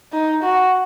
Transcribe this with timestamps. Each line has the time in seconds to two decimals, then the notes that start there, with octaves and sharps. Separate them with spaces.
0.12 D#4
0.43 F#4